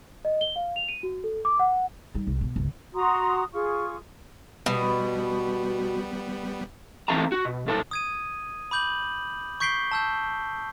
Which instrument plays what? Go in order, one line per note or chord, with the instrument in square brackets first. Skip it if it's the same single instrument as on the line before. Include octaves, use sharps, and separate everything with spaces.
[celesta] D#5
G7
F5
F7
D#7
F#4
A4
D6
F#5
[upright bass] G3 D#4
C2
B2
G1 C#2
[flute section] F#4 A#5 C6 D#6
F4 G#4 C#6
[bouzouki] B2 [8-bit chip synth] G3 B3
[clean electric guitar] E3 C4 A4 F5 A5 A#5
F#4
B2
B1 A#2 A4 C5 A5
[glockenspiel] D#6 G#6 D#7
B5 D6 G6 F#7
C#6 G6 B6 C7 D7 G7
A5 E6 G6